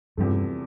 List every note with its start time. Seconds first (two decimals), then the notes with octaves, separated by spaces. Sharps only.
0.17 E2 G2 C3 F3 A3